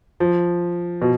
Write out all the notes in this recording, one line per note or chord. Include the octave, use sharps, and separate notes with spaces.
F3
B2